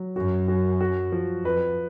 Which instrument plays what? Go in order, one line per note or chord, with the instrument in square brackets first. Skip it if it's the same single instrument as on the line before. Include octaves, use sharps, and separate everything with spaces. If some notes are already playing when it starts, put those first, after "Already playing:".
Already playing: [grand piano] F#3
[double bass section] F#2 [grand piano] F#4
[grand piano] F#4
F#4
F3
[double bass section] F2 [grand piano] B4